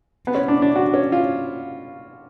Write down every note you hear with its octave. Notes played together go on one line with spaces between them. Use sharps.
B3
C#4
D4
D4
F#4
C#4
F4